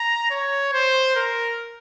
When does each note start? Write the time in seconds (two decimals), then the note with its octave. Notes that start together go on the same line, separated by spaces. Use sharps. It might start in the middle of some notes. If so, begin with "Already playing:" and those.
Already playing: A#5
0.30 C#5
0.73 C5
1.16 A#4